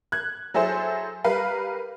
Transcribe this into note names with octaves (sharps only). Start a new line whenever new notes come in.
F#6 G#6
F#3 E4 G#4 A4 C5
G3 A#4 B4 F5